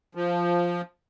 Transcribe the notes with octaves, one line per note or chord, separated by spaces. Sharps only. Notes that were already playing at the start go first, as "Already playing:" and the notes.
F3